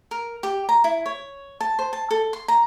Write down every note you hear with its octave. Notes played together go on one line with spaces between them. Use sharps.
A#4
G4
A#5
E4
C#5
A5
C5
A5
A4
C6
A#5